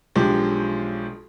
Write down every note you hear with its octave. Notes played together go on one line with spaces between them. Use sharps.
B1 F3 G#3 D4 G4